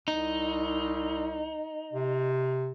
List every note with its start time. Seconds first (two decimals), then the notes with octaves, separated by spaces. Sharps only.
0.08 C2 D#4
1.93 C3